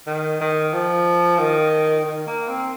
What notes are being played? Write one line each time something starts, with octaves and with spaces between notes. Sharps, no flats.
D#3
D#3
F3
D#3
D#3
A#3
C4